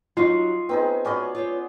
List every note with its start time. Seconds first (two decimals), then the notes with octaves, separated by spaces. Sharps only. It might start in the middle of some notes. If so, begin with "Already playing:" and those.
0.17 F#3 D#4 F4 F#4 D#5 C#6
0.69 B3 C4 D#4 G#4 B4
1.05 B3 C#4 F#4 D5 D#5 G#5
1.35 F4 C5 C#5